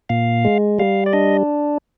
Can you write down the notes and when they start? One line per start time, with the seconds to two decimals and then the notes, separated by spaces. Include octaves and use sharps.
0.09 A#2 F5
0.45 G#3
0.79 G3 F5
1.06 D5
1.13 D4 D#5